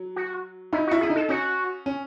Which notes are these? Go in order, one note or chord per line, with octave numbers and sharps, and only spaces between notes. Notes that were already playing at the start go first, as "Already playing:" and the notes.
Already playing: F#3
F#4
D#4 E4
F#4
E4
G#4
E4
D#4
A4
C#4 F#4
C#4